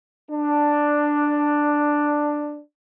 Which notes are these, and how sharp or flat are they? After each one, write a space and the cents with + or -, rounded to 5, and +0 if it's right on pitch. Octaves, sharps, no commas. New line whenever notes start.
D4 +5